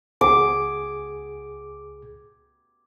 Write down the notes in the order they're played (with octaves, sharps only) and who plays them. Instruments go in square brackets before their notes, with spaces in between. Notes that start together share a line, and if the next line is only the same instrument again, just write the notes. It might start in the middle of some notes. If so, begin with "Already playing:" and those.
[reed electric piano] C#2 G#4 [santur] D6